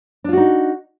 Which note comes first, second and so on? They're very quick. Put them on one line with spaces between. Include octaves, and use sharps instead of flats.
D4 F4 F#4 D#4